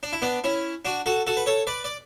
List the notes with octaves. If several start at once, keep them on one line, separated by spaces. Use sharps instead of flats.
D4
E4
B3 D4
C#4 E4
D4 F#4
F#4 A4
F#4 A4
B4
A4 C#5
B4 D5
D5